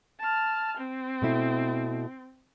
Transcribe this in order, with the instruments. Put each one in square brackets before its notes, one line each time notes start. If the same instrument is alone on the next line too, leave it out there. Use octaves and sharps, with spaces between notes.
[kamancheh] A5 F6
C4
[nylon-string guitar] B2 A3 E4